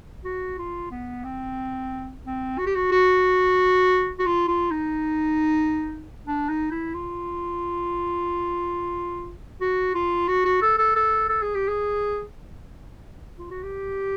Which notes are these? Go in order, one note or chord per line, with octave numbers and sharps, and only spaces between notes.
F#4
F4
B3
C4
C4
F#4
G4
F#4
F#4
F#4
F4
F4
D#4
D4
D#4
E4
F4
F#4
F4
F#4
F#4
A4
A4
A4
A4
G#4
G4
G#4
F4
F#4
G4